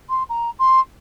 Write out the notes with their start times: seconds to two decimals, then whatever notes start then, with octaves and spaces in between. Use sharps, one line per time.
0.09 C6
0.29 A#5
0.59 C6